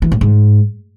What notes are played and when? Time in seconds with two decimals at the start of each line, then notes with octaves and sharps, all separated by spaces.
0.02 E3
0.12 A2
0.21 G#2